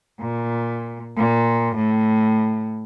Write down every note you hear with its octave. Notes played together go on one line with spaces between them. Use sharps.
A#2
A#2
A2